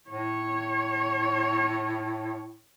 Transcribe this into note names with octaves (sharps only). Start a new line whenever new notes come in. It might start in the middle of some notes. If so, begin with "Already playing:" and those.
A2 C#5